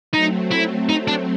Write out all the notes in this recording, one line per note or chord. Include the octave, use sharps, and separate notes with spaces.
F#3 A3 C4 D#4
E4
D#4
D4